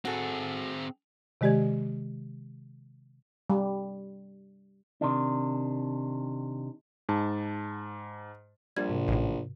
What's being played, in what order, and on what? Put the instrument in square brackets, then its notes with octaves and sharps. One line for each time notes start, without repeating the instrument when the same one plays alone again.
[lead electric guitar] C4 G#4 [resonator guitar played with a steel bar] F#4 A4
[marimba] C3 D#3 G#3 G4 D5 G#6
[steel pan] G3
[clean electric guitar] C3 D#3 D4
[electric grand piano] G#2 A5
[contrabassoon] A#1 [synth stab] G3 [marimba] G#6
[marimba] G#2 C3
[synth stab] A1 A2